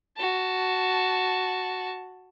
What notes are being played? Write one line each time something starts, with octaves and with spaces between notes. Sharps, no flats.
F#4 A5